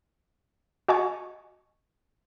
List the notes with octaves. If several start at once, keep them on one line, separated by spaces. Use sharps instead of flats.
F#4 D#5 G#5 A5 C#6